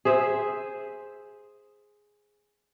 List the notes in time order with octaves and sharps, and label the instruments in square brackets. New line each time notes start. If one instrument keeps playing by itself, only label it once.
[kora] G#4 C5 E5